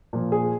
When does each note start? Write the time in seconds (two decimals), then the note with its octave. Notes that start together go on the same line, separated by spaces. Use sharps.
0.13 A#2 F3
0.32 G#4